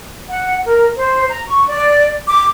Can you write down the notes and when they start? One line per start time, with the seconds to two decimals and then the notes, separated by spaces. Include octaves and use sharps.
0.29 F#5
0.64 A#4
0.96 C5
1.29 A#5
1.47 C#6
1.67 D5
2.28 D6